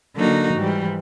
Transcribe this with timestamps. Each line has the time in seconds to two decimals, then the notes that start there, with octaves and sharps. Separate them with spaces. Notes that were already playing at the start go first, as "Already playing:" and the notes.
0.16 D3 F#3 A#3 D#4 F#4
0.54 G#2 E3 G3